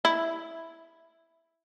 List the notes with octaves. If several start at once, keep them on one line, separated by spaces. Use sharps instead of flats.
E4